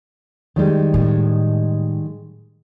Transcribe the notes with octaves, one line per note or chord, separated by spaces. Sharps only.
D#3 G3 G#3
A2